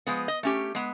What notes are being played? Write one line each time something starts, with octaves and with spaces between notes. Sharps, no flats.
F3 G#3 B3
D#5
A3 C#4 G4
G#3 B3